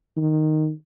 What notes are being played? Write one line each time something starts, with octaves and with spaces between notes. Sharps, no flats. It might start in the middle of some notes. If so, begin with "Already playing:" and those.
D#3